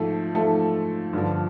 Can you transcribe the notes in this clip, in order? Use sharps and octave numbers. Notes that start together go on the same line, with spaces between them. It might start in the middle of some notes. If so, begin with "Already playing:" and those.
Already playing: G#2 F3 A3 A4
G#2 F3 A3 A4
G2 D3 F3